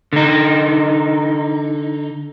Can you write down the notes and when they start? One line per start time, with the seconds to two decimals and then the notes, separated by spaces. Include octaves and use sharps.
0.13 D3 D#4